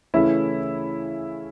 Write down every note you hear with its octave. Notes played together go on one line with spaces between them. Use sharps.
C#3 E3 A3 C#4 E4